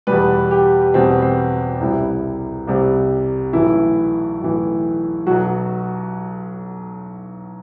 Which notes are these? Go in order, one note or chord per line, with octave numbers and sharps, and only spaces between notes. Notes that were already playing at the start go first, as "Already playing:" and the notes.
E2 B2 G3 B4
G4
E2 B2 G3 C4
C4
C2 C3 G3 E4
C2 C3 G3
B1 A2 E3 E4
B1 A2 E3
B1 B2 F#3 F#4